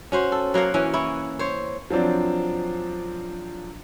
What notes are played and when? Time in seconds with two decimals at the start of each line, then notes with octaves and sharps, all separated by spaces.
0.12 C#4 F#4 C5
0.32 A4
0.54 F#3 A#3 F5 F#5
0.74 E3 C#4
0.94 E4 C#5
1.39 C5 C#5
1.90 F3 F#3 C4 D4